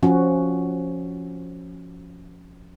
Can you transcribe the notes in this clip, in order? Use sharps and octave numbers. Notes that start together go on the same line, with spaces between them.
F3 C#4 F#4